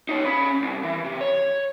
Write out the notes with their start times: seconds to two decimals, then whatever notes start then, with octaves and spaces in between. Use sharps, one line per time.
0.09 D#4 C#5
0.26 C#4 B5
0.62 C2
0.84 E3
1.04 C3
1.21 C#5